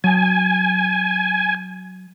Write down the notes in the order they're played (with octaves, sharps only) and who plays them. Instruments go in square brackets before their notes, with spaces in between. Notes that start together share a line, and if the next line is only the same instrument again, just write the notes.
[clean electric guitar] F#3 A5 [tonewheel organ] G#5